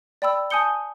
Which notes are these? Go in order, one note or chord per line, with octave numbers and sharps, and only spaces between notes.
D5 G5 B5 E6
G#5 A5 D#6 G6 C#7 G7